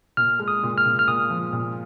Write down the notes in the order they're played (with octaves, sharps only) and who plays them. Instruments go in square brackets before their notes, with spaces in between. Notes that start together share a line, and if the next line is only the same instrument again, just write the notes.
[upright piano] A#2 [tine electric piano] F6
[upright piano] G#3
[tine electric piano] D#6
[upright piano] A#2
[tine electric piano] F6
[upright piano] A#2
[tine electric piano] F6
[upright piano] A#2 [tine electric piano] D#6
[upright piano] F3
A#2